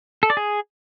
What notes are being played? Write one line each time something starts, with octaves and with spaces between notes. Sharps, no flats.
A4
D5
G#4